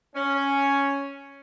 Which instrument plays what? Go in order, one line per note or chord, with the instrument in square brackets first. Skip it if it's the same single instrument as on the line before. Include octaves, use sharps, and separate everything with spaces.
[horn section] C#4